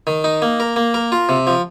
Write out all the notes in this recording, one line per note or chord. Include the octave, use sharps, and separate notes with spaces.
D#3
D#4
A#3
A#4
A#3
A#4
F4
C3
F3